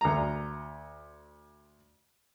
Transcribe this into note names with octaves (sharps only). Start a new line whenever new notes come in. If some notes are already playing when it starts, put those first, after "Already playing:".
D2 A#5